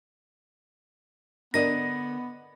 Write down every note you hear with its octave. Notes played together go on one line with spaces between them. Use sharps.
D3 B3 D4 A#4 D5 D#5 A#6